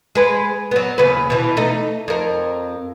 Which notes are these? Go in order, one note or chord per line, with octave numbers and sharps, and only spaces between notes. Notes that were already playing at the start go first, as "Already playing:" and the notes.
G#3 B4
F#3 B3
D#2 C#3 B4
B2 E3
A3 D#4
F2 A#4